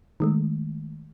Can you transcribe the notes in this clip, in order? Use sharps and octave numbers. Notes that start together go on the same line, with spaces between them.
D#3 G#3 A3